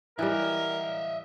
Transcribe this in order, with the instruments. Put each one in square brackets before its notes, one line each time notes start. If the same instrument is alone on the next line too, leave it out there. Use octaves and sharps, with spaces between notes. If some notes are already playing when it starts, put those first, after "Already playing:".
[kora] E3 G3 [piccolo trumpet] A#4 [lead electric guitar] D#5 E5